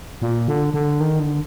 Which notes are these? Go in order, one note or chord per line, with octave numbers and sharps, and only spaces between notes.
A#2
D3
D3
D#3
D3